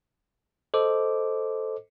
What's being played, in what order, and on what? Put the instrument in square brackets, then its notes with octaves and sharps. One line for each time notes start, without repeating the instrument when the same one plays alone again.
[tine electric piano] A4 C5 D#5 D6